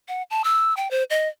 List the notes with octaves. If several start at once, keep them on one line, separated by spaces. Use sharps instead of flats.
F#5
A5
E6
G5
C5
D#5